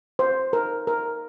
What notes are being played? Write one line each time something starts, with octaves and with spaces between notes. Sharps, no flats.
C5
A#4
A#4